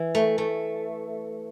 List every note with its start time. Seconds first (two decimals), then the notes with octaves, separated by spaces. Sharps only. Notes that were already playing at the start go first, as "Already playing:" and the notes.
Already playing: E3
0.15 A3
0.38 A3